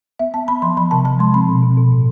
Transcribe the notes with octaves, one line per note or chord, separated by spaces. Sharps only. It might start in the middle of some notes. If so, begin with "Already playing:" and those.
B3 E5
B3 A5
B3 B5
F3 C6
F3 B5
C3 A5
F3 A5
G#3 C6
C4 B5
B2
B2
B2
A2